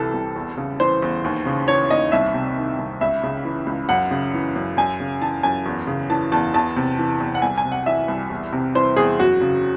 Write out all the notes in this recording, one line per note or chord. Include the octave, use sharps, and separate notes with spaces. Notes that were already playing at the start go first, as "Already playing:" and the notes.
Already playing: C2 C3 E3 A4
C2
E2
C#3
E3 C5
E2
D#2
C#3
E3 C#5
D#2 D#5
C2 E5
C3
D#3
C2
C#2 E5
C#3
E3
C#2
F#2 F#5
C#3
E3
F#2
F#2 G#5
C#3
E3 A5
F#2 G#5
E2
C#3
E3 A5
E2 A5
E2 A5
C3
E3
E2
F#5
C2 G#5
G#5
C3
F#5
E3 E5
C2
E2
C3
E3 C5
E2 G#4
F#2 F#4
C#3